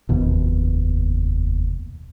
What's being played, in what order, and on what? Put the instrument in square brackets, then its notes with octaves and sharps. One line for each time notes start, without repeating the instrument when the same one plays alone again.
[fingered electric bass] F1 D#2 B2